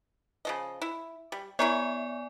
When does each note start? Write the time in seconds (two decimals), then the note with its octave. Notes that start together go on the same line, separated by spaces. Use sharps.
0.45 C#3 F3 D#5
0.82 E4
1.32 G3
1.59 B3 E4 A#4 C#5 D5 G#5